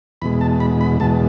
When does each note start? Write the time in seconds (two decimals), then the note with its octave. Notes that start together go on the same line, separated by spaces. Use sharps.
0.22 E2 B2 G#3 B5
0.41 A5
0.60 B5
0.81 B5
1.00 E2 B2 G#3 A5